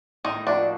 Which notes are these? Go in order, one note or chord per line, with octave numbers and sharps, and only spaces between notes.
A2 D#3 D#4
F3 A#3 D4 D#4 F#4